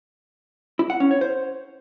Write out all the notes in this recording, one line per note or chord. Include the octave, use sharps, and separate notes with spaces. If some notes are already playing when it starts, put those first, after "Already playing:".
E4
F#5
C#4
C#5
C5